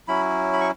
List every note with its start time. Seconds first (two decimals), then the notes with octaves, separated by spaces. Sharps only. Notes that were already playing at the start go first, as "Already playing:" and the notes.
0.08 F#3 C#4 E4 B5
0.53 B5
0.61 C#6